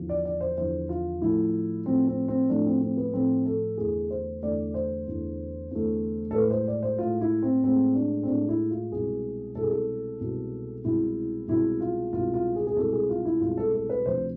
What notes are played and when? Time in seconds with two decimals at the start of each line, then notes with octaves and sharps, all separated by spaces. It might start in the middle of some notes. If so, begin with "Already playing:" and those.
Already playing: E2 D3 F3
0.09 D5
0.25 D5
0.41 C5
0.57 E2 D3 F3 C5
0.89 F4
1.21 A2 F3 A3 E4
1.85 A2 F3 A3 C4
2.07 C4
2.28 C4
2.49 A2 F3 A3 D4
2.66 C4
2.81 C4
2.97 B3
3.13 A2 F3 A3 C4
3.46 A4
3.77 E2 D3 A3 G#4
4.10 C5
4.42 E2 D3 A3 D5
4.74 C5
5.07 E2 D3 A3
5.71 E2 D3 A3
6.31 A4
6.34 A2 G#3 B4
6.51 C5
6.68 D5
6.83 C5
6.99 A2 G#3 F4
7.21 E4
7.42 C4
7.64 A2 G#3 C4
7.95 D4
8.23 C4
8.28 A2 G#3 D4
8.49 E4
8.71 F4
8.92 C2 B2 G#3 G#4
9.55 C2 B2 G#3 A4
9.63 G#4
9.70 A4
10.20 C2 B2 G#3
10.84 C2 B2 G#3 E4
11.48 C2 B2 G#3 E4
11.81 F4
12.13 C2 B2 G#3 F4
12.34 F4
12.56 G#4
12.67 G#4
12.76 C2 B2 G#3 A4
12.93 G#4
13.10 F4
13.25 E4
13.41 C2 B2 G#3 F4
13.57 A4
13.74 A4
13.89 B4
14.06 D2 C3 F3 C5